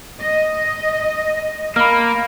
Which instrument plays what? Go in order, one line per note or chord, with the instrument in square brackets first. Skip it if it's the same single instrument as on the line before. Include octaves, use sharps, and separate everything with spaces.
[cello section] D#5
[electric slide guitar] A#3 [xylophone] B5 F6